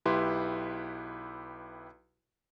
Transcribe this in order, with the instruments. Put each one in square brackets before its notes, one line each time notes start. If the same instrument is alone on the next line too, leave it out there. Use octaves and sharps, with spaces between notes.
[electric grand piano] B1 E4 G4 B4 C6